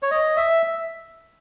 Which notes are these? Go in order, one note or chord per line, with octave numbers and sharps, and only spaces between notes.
C#5
D#5
E5